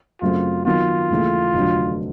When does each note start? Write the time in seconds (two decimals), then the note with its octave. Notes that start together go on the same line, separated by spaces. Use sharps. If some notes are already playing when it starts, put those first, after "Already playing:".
0.21 F#2 C#3 F#3 A3 C4 F4
0.65 D#3 F#3 B3 F4
1.10 D#2 C#3 E3 A3
1.54 F1 F2 D3 F#3